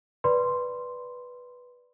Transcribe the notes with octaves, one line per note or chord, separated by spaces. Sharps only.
B4 D5 B5 C6